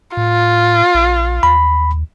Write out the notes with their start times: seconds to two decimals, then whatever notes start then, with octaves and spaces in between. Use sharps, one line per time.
0.17 A2 F4
0.95 A#1
1.43 D#2 B5